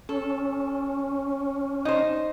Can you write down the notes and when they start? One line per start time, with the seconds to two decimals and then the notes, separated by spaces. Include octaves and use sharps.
0.09 C#4 A4
1.85 D#4 C5